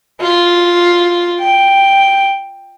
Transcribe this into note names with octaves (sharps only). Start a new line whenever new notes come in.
F4
G5